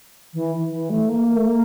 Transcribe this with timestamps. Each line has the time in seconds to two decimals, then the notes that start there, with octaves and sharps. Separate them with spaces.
0.34 E3
0.71 E3
0.90 A3
1.08 A#3
1.36 A3
1.47 A#3